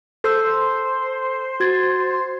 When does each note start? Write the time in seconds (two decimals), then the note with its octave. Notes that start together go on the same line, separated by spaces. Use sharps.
0.24 A4 C5 E6
1.60 F#4 G#6 A6